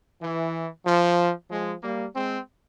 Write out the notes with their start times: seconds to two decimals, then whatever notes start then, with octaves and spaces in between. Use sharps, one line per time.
0.22 E3
0.86 F3
1.50 F3 G#3
1.83 G3 A#3
2.15 G#3 C4